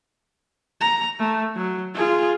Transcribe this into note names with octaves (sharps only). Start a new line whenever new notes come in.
A#5
A3
F#3
F4 G#4